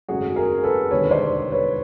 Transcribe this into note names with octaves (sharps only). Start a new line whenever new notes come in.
G#1 F#2 C#3 F#3 A3 F#4 G#4
G#4 A#4
A4 B4
E1 D#2 D3 G3 B4 C#5
C5 D5
B4 C#5